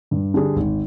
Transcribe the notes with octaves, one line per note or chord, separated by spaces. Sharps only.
G2
D3 G3 D4 G#4
G#1